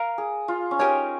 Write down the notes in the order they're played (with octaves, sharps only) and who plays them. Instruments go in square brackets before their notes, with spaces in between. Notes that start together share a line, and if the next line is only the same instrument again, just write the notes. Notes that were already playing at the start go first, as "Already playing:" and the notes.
Already playing: [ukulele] A#4 F5 A#5
[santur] G#4
F4
C#4
[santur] D#4 [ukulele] G4 A#4 C#5 G#5